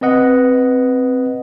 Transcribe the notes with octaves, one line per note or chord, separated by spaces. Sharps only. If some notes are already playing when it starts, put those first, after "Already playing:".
C4 B4 D#5 F#5